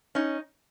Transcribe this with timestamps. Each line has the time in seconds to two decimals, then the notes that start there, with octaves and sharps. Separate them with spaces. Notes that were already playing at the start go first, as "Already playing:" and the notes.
0.15 C#4 D#4